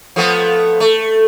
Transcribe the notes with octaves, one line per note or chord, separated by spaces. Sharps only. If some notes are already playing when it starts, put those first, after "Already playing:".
F3 A3 B3
A3